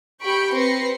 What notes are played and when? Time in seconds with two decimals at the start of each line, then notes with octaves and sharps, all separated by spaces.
0.23 G4 B5 C#6 G6 C#7 D7
0.54 C4 B4 C6 A#6 C7 C#7